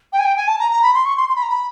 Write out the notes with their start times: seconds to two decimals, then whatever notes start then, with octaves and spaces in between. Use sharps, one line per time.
0.13 G5
0.19 G#5
0.25 G5
0.37 G#5
0.48 A5
0.59 A#5
0.71 A#5
0.83 B5
0.94 C6
1.05 C#6
1.17 C6
1.29 C6
1.36 B5
1.43 A#5
1.49 B5